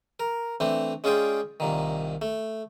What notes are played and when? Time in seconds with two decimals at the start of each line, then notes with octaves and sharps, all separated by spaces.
0.20 A#4
0.60 E3 A3 C4 D4
1.04 G#3 C#4 F4 G#4 D5 G5
1.60 C2 A#2 D#3
2.22 A3